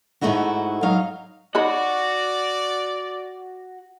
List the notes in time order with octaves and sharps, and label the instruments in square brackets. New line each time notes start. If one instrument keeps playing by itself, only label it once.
[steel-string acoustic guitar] G#2 B2 A3 D#4 E4 F#4
F#3 D#4 F5
[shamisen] D#4 C#5 B5 [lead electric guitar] F#4 F#5 [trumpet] D5